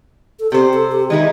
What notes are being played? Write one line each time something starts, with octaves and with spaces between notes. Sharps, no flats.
A4
C3 G4 C5
A4
G4
D#3 G#3 D#4 E4